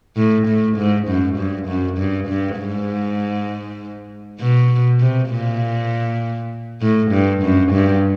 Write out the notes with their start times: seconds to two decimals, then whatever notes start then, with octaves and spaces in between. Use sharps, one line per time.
0.17 A2
0.47 A2
0.77 G#2
1.08 F#2
1.37 G2
1.68 F#2
1.98 G2
2.28 G2
2.59 G#2
4.40 B2
5.00 C3
5.30 A#2
6.82 A2
7.12 G2
7.42 F#2
7.72 G2